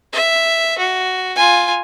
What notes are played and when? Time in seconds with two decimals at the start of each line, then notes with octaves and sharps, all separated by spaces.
0.13 E5
0.78 F#4
1.36 F4 G#5